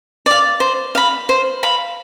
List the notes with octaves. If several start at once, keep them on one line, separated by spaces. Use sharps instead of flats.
D5 F5
C5
F5 B5
C5
F5 B5